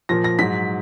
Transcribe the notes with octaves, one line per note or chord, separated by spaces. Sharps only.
A#2 F3 A#6
A#6
G#2 F#3 B6